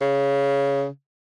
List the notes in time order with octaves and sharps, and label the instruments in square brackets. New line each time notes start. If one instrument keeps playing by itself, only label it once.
[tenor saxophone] C#3